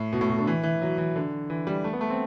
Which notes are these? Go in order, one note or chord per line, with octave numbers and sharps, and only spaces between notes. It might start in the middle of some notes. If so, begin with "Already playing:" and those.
Already playing: A2
B2
A2
B2
D3
E3
E3
F#3
E3
D3
E3
G3
A3
B3
A3
C4